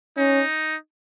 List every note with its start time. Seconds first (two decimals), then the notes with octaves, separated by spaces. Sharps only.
0.17 C#4 D#4